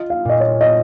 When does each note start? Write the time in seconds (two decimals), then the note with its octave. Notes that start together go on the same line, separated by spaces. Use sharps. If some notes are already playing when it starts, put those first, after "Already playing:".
Already playing: F4 D#5
0.10 F5
0.25 A#2 D#5
0.40 C#5
0.61 D#5